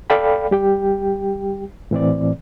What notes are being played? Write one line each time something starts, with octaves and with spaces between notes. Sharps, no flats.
A4 D5 F5 G5 B5
G3 G4 G5
A2 E3 C4 D5